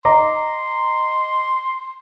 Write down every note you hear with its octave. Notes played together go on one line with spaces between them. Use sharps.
D#5 A#5 C6 D6